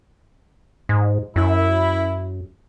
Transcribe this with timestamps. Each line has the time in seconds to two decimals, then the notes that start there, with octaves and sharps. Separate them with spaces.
0.89 G#2
1.36 F#2 E4